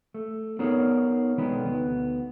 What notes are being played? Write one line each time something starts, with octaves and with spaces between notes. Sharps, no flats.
A3
B3 D#4 G#4 A#4 C#5
B1 D#3 G#3 B3 B4
D2 B3